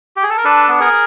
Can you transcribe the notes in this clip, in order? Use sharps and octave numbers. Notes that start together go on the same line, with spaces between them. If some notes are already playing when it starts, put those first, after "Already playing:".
G4
G#4
A4
A#4
D4 A4 B4
B3
G#4 A#4